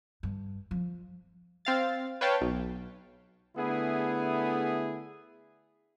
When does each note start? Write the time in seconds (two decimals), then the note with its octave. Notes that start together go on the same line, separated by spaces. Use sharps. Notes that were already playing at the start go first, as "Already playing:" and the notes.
0.23 G2
0.71 F3
1.65 C4 F5 A6
2.21 B4 C#5 F5 G5 A5
2.41 B1
3.55 D3 A3 B3 E4 G#4